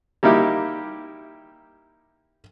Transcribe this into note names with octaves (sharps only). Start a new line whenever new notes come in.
G3 A#3 D#4 E4 G4